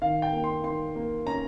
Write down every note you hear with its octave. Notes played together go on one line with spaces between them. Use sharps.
D#3 F5
G5
A#3
C6
D#3 C6
A#3
C#4 A#5